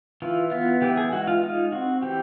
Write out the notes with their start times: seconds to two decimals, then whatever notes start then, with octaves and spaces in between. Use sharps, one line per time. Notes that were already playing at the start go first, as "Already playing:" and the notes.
0.22 E3 F4
0.51 B3 F4
0.82 E3 G4
0.97 G#4
1.12 G#3 F#4
1.28 F4
1.42 D#4 F4
1.72 C4 F#4
2.03 E3 G4